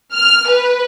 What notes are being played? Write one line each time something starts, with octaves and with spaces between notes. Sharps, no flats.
F6
B4